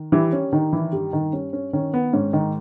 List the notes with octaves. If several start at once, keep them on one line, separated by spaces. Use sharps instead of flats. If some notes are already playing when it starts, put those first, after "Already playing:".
Already playing: D#3
E3 G3 E4
C#4
D#3 D#4
E3 E4
G2 G3 G4
D#3 D#4
G3 C#4
C#4
D#3 C#4
B3
G#2 C#4
D#3 D#4